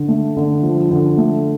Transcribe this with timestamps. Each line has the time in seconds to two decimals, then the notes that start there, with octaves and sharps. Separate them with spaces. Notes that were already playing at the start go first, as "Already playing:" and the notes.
Already playing: D3
0.08 A3
0.37 D3
0.63 F3
0.91 D3
1.17 A3